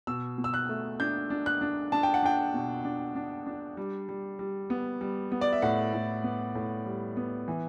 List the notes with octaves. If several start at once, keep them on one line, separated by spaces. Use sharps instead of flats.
B2 E6
B2
E6
F#6
A3
D4 G6
D4
F#6
D4
D4 A5
G5
F#5
D4 G5
B2
D4
D4
D4
G3
G3
G3
B3
G3
B3
D5
E5
A2 F#5
A2
B3
A2
G3
B3
E3